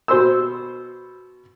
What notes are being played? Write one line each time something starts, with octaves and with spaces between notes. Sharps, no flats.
B2 C5 C6 E6